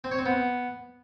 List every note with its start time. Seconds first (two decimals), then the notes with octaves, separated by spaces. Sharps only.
0.04 C4
0.11 C#5
0.19 C4
0.26 B3